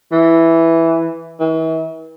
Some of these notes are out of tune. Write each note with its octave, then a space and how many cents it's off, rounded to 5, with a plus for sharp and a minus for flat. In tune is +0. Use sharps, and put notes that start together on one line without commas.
E3 +0
E3 -40